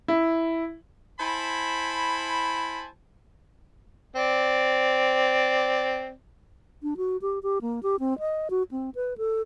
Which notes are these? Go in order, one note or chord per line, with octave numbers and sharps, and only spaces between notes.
E4
E4 C5 G#5 A5 B5
C4 D5
D4
F#4
G4
G4
A#3
G4
C4
D#5
F#4
C4
B4
A4